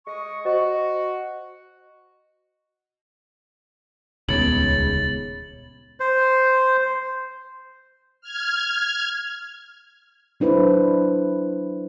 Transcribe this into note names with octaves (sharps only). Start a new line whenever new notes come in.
G#3 D#5 C#6
F#4 C5 D#5
D#1 C#2 B3 G#4 C#5 A6 F#7
C5
F6 G#6
F#3 D4 E4 B4 C5